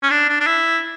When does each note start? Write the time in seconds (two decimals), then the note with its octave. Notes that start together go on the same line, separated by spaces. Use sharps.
0.03 C#4
0.10 D4
0.29 D4
0.40 D4
0.47 E4